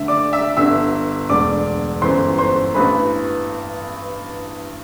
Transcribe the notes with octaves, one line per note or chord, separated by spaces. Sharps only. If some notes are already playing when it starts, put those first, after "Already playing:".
Already playing: D2 D3 E5
D5 D6
E5 E6
G1 G2 D3 E5 E6
E1 D2 D3 D5 D6
G1 F#2 E3 C5 C6
C5 C6
A1 G2 E3 B4 B5